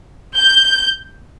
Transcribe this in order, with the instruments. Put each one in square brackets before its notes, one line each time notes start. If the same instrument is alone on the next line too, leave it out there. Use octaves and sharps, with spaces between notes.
[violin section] G6